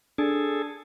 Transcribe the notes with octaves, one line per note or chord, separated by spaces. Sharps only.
D4 G#4 A4